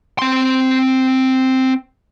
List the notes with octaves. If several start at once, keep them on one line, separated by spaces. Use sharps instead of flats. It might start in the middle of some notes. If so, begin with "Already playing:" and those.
C4 C6